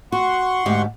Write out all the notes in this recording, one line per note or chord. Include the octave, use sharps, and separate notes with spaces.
F#4 F#5 C6 C#6
D2 G#2 G4